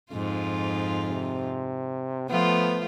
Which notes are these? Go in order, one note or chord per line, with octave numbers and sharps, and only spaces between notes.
F2 G#2 F4
C3
F3 A3 B3 F4